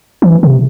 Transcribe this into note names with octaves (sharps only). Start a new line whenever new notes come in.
E3
C3